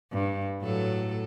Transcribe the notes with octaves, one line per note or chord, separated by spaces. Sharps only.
G2
A2 F#3 A4